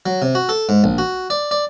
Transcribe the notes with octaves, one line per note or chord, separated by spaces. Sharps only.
F#3
C3
F#4
A4
G#2
A#1
F#4
D5
D5